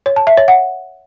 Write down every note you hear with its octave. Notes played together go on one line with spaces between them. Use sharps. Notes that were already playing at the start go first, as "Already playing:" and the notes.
C#5
A5
E5
C#5
F#5